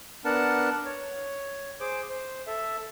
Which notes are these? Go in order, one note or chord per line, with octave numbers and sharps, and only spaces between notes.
B3 D4 A#4 F#5 A5
C#5
G#4 C5 D6
C5
A4 E5